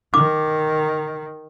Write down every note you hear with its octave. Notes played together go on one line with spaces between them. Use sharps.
D#3 D6